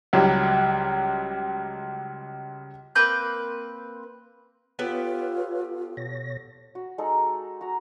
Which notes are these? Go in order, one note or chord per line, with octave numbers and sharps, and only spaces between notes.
C#2 F#3 G3
A#3 C4 B4 G6
B3 F4 G4 A4 B4 C#5
B2 C#5 A#6
F#4
G#3 D#4 A4
F#4 A#5